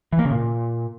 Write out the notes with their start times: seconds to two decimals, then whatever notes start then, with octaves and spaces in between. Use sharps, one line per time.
0.13 E3
0.19 A#3
0.25 C#3
0.31 A#2